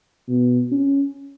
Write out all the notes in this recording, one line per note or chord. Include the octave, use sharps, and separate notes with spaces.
B2
C#4